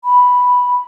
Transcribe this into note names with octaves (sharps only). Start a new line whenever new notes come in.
B5